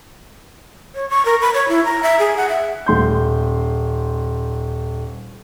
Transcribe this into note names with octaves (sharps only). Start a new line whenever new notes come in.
C#5
C#6
A#4
B5
C#5
E4
A#5
E5
G#4
F#5
E5
D#1 C6 G6